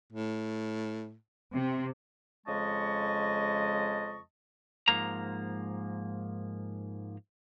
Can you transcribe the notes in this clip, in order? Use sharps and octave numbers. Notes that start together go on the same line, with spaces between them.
A2
C3
F2 C#3 G#3 D#5 A5 C#6
G#2 F3 A#3 A#5